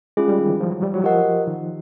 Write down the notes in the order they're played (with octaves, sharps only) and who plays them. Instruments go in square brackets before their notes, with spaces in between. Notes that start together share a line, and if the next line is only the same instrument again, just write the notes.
[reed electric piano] G#3 [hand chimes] C#4 F4 G#4
[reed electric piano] G3
D#3
E3
F3
F#3
G3
F#3
[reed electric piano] F3 [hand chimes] G4 A#4 D#5 F#5
[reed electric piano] D#3